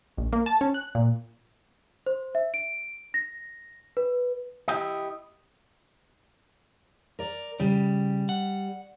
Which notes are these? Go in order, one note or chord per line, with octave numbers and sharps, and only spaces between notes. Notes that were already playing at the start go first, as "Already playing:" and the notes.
A#1
A#3
A5
C#4
F#6
A#2
C5
E5
D7
A#6
B4
E4 G4 D#5
A#4 D5
C#3 G3
F#5